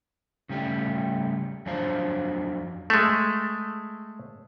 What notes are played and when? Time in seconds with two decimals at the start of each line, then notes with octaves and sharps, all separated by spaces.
0.49 C#3 G3 A3 G4
1.66 F2 F#3 D4 C5 F5
2.90 G#3 A3